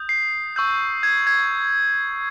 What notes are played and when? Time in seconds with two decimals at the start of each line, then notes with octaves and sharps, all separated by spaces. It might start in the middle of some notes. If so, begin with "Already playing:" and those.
Already playing: D#6 G6
0.09 C7
0.56 C#6 E6 G6
1.03 G#6
1.27 G#6